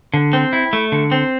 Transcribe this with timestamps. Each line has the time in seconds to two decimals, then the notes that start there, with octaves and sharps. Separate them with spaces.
0.14 D3
0.33 C4
0.53 E4
0.73 A3
0.92 D3
1.12 C4